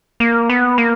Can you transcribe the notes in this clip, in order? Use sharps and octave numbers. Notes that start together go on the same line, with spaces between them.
A#3
B3
A#3